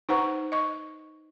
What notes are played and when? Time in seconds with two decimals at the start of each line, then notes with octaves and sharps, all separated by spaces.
0.09 D#4 B4 C5 F#5 A#5 C#6
0.52 D#5 C#6